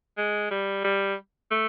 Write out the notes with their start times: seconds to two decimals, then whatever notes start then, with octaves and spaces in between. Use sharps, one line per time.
0.18 G#3
0.51 G3
0.84 G3
1.51 A3